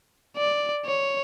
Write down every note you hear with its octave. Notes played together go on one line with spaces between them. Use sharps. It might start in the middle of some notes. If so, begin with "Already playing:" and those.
D5
C#5